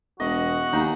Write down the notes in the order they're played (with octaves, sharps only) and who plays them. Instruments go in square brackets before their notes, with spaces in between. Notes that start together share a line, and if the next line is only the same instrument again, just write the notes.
[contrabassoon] E1 [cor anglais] F#4 [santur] D#5
[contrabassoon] D#2 [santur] D#4